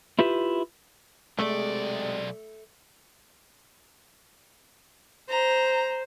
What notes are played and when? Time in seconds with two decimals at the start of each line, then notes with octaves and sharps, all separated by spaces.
0.19 E4 F4 G4 B4 E5
1.39 B1 C3 G#3 A3 D5
5.30 C5 A#5